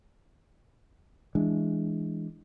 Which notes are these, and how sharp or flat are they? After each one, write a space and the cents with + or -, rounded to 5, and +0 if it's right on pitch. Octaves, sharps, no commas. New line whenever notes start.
E3 +0 G#3 +0 D4 +0